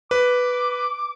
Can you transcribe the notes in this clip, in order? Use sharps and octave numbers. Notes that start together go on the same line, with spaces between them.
B4 D6